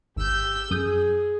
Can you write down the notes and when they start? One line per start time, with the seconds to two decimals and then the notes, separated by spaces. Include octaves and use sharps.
0.16 G#1 G4 E6 G6
0.70 F#2 G#4 D#6 G6